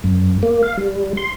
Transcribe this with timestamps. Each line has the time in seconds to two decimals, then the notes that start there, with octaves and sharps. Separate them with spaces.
0.04 F#2
0.43 A#3
0.63 F5
0.77 G3
1.17 C6